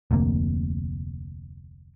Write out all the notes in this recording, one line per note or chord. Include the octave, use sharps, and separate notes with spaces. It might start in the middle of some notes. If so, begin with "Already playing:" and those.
F1 D2 C3 A#3